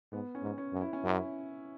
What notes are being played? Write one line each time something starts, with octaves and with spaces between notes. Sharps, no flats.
G#2 B3
C#4
G#2
C#4
F#2
E4
C#4
F#2 E4